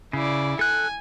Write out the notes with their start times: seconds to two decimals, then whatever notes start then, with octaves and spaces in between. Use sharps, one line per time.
0.13 C#3 E4 D5
0.59 A4 G#5 F#6